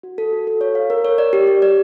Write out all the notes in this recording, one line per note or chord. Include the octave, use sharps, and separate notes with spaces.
F#4
A4
F#4
A4
C#5
F5
A#4
C#5
D5
G4
G4
D5